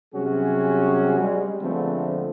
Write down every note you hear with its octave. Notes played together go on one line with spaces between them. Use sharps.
C3 F#3 G3 C#4 F#4 G#4
G3 G#3
D3 F3 G#3 A3 B3 C4